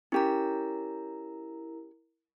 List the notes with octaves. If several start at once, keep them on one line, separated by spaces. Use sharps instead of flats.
C#4 E4 G4 A#4 A#5